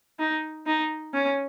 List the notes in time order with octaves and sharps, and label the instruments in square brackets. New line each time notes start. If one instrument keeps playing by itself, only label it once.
[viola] D#4
D#4
C#4